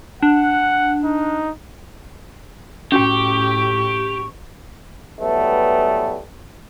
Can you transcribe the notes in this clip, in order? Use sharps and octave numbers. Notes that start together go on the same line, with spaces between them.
D4 F#5
D#4
A2 C#4 F#4 G4 G5 C#6
E3 F#3 G3 A3 B3